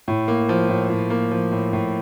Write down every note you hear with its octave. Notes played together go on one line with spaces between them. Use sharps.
A2
A#3
F3
A2
A2
A#3
F3
A2
A2